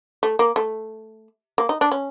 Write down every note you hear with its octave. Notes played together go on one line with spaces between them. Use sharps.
A3
A#3
A3
A#3
D#4
D4
C#4